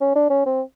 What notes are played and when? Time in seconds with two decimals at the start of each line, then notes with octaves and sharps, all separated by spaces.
0.01 C#4
0.16 D4
0.30 C#4
0.46 C4